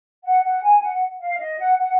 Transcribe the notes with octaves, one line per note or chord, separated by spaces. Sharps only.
F#5
F#5
G#5
F#5
F5
D#5
F#5
F#5